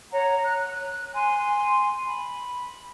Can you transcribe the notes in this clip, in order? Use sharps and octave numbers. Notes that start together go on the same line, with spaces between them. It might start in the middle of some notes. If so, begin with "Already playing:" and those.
C#5 F#5 A#5
F#6
G#5 C6
B5